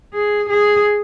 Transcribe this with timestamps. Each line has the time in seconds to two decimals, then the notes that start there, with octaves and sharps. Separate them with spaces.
0.14 G#4
0.49 G#4